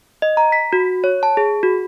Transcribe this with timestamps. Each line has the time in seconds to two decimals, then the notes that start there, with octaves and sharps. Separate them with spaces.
0.22 D#5
0.37 A#5
0.52 B6
0.73 F#4
1.04 C#5
1.23 A5
1.37 G#4
1.63 F#4